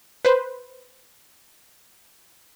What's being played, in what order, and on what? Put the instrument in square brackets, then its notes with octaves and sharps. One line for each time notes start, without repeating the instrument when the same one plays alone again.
[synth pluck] B4 C5